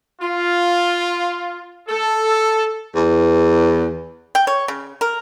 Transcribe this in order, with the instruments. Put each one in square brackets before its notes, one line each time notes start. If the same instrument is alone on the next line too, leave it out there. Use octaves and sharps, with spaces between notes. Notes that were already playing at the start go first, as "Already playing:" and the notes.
[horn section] F4
A4
[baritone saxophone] E2
[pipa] G5
C#5
C#3
A#4